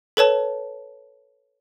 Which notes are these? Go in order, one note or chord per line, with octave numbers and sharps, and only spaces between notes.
A4 B4 C#5 A5